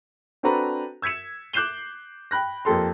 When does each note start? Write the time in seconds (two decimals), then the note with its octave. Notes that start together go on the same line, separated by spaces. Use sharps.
0.43 C4 D4 F#4 A4 B4 A#5
1.02 E6 G#6 B6 C#7 E7
1.53 D6 F#6 G6 C7 E7 G7
2.31 G5 B5 F#6 A#6
2.65 F2 A#3 G4 A4 C6